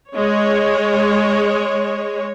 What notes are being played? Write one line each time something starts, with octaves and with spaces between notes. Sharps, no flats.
G#3 C#5